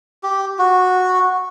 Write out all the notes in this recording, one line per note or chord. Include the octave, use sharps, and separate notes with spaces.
G4
F#4